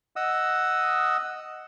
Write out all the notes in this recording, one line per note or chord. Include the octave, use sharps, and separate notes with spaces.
D#5 F#5 D#6 E6